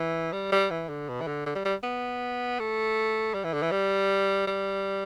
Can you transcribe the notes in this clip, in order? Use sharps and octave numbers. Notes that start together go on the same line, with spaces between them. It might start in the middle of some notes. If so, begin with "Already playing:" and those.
Already playing: E3
G3
G3
E3
D3
B2
E3
D3
D3
G3
G3
B3
A3
G3
E3
D3
E3
G3
G3